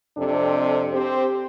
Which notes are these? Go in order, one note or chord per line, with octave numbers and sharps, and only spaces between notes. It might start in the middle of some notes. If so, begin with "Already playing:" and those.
F2 C3 D4 A4
C4 G4 C5